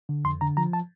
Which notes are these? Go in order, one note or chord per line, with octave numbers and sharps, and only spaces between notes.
D3
F2 C6
D3 A#5
F3 A#5
A5